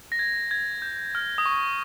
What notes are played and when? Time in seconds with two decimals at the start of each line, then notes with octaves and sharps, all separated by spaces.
0.12 A#6
0.19 G#6
0.51 G#6
0.82 G6
1.15 F6
1.38 D#6
1.46 C#6